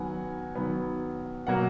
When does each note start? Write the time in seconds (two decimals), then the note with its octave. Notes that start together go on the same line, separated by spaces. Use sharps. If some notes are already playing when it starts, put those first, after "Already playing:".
Already playing: D#3 F#3 B3 F#5 G#5
0.55 D#3 F#3 B3
1.47 B2 F#3 A#3 F#5